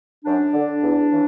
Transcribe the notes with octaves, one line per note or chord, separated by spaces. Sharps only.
F#2 D4
D3
E2
C#3 E3